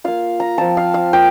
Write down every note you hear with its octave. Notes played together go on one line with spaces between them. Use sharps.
A#3 F4 F5
A#5
F3 C4 F4 A5
F5
F5
A#3 F4 G5